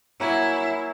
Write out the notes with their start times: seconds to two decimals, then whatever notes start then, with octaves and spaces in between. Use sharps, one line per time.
0.20 F#3 A#3 E4 G#5